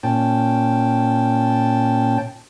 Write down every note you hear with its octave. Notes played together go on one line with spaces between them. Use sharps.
A#2 C#4 G5 A5